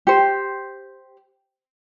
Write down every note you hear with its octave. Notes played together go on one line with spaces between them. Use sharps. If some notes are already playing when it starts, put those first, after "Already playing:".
G4 C5